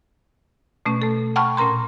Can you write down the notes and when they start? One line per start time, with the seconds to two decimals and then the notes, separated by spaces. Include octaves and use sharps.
0.86 B2 A3 C#4
1.02 A3 A4
1.36 F#5 G5 A5 B5 C#6 F6
1.57 A#2 C#4 A#4 A#5 C6